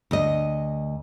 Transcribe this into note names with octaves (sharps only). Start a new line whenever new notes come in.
D2 D#5